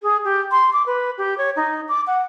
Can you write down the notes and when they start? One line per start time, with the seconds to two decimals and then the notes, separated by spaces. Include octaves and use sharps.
0.02 G#4
0.24 G4
0.51 C6
0.73 D6
0.86 B4
1.18 G4
1.38 C#5
1.56 D#4
1.89 D6
2.07 F#5